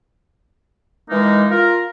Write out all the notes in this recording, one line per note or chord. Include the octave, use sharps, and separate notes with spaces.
E3 G#3 A#3 D#4
F4 A#4